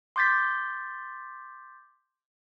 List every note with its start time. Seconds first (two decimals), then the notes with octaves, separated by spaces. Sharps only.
0.16 C6 D6 G6 A6 B6